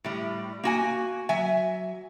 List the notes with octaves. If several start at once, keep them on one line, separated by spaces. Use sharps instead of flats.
A2 G3
A#3 F#4 G#5
F#3 E5 G#5